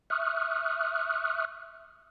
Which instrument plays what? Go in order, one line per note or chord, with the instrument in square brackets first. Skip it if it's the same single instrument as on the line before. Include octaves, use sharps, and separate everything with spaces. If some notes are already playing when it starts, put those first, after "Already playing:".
[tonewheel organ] E5 C#6 D#6 F6 F#6